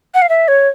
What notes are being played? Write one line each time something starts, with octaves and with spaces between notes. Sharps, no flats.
F#5
F5
E5
C#5